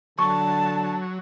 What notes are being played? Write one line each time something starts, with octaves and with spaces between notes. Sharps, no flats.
D3 F#3 A5 C#6